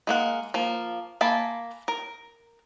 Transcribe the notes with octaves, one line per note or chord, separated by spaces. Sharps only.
G#3 A#3 F#5
F3 A#3
A#3 G#5 A5 B5
A#4